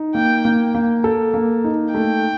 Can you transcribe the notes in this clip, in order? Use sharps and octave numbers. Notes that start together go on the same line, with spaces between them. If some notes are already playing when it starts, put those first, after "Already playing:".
Already playing: D#4
A#3 G5
A#3
A#3
A4
A#3
D#4
A3 G5